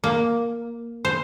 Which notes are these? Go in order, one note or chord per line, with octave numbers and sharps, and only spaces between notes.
A#3
C5